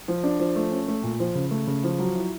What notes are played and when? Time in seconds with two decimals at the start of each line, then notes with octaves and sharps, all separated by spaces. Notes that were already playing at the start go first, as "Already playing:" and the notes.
0.08 F3
0.24 D4
0.39 F3
0.56 A3
0.72 C#4
0.88 A3
1.03 A#2
1.20 F3
1.35 C#3
1.51 A3
1.67 C#3
1.84 F3
1.99 F#3
2.15 E4